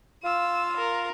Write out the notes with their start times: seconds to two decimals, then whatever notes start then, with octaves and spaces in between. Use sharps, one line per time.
0.24 F4 F5 E6
0.77 A#4